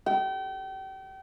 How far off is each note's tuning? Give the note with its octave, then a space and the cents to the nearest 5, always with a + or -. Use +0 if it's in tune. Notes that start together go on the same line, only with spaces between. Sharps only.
G5 -35